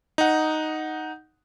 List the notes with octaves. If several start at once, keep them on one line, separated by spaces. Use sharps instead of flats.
D#4 F#5